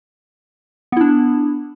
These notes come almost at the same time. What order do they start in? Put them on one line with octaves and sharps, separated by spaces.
B3 E4 D4